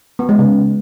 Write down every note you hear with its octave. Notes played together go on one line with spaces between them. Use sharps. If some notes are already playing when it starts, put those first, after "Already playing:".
B3
G#3
C#3